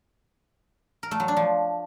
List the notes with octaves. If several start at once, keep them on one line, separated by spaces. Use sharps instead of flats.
A#4
A3
F#3
D4
F3